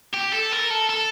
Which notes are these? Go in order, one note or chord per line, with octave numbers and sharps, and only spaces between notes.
G4
A4
A#4
A4
A4